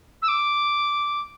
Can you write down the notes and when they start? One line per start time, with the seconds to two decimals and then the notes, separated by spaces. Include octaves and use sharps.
0.22 E6
0.28 D6